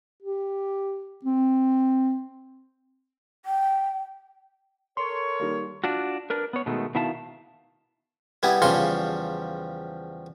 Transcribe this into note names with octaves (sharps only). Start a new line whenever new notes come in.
G4
C4
G5
A4 A#4 C#5 C6
D#3 G3 A#3
D4 F4 F#4
D4 A#4 B4
B3 C#5
B2 D#3 G#3 A3
B2 D#3 E4 E5 F5 A5
G3 B3 E4 G#4
E2 C#3 F3 G3 C6 C#6